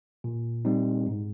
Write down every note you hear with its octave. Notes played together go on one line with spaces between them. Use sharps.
A#2
G3 C4 D#4
G#2